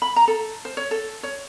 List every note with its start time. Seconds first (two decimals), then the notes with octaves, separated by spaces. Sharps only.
0.02 B5
0.16 A#5
0.28 A4
0.65 C5
0.77 C#5
0.91 A4
1.23 C#5